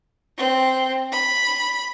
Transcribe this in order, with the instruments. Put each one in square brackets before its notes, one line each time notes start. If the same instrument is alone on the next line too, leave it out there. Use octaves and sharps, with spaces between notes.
[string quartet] C4
B5